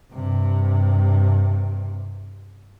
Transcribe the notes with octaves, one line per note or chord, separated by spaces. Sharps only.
G2 C3